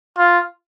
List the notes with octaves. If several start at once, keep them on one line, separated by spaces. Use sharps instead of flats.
F4